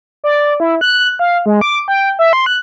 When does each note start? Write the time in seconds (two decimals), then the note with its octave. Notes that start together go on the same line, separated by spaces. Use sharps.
0.24 D5
0.60 E4
0.81 F#6
1.19 F5
1.46 G#3
1.61 D6
1.88 G5
2.19 E5
2.33 C6
2.46 F#6